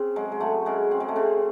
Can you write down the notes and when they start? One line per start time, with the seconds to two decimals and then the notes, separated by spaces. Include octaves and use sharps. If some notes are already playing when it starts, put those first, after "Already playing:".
Already playing: C#3 C4
0.16 F#3 G#3
0.32 G#3
0.40 F#3 A3
0.66 C#3 G#3
0.91 C#3 C4
1.00 G#3
1.08 A3
1.16 C#3 C4